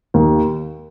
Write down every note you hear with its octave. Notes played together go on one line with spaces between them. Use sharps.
D#2